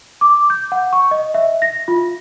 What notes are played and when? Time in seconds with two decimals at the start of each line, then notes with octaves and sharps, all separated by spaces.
0.21 D6
0.50 G6
0.72 F#5
0.93 C#6
1.11 D#5
1.34 E5
1.62 A#6
1.88 F4